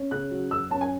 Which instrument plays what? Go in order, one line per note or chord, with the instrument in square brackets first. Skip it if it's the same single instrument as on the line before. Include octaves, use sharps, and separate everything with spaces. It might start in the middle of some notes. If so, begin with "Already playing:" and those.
Already playing: [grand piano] C#4
C#3 F#6
F#3
F#2 E6
C#4 A5
G#5